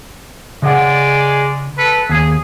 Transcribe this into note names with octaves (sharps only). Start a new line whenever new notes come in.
C#3 G#3 D5 F#5
A4 B4
D#2 G#4